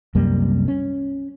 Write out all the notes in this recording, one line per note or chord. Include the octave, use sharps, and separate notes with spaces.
C2 F#2 G3 A#3
C#4